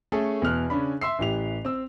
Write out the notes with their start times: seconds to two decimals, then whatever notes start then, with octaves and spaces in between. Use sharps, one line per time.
0.12 A3 C#4 G#4 A4
0.42 E2 B2 F6 F#6
0.70 C#3 C#4 D4 B5
1.01 E5 C6 E6 C7
1.19 A1 E3 G4 F7
1.65 C4 E6